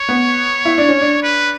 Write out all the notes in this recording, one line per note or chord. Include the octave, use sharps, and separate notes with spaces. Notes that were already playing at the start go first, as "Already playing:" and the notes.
Already playing: C#5
B3
E4
D4
C#4
D4
B4